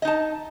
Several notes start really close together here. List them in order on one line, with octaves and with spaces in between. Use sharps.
D#5 D#4 A5